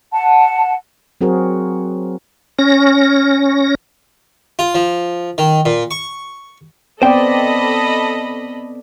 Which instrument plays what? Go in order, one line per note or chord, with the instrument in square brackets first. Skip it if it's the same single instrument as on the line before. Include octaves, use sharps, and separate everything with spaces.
[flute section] F#5 A5
[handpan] F#3 C4 F#4 G#4 A#4
[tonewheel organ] C#4 A#6
[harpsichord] F4
F3
D#3
A#2
C#6
[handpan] B3 C4 D5 [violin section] A4 D#5 B5 [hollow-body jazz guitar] C5 G5